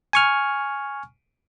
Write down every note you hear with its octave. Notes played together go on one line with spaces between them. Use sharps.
G#5 C#6 F6